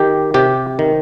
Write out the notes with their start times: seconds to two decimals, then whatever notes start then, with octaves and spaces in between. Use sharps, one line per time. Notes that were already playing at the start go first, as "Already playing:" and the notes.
Already playing: D#3 G4
0.34 C3 G4
0.79 D#3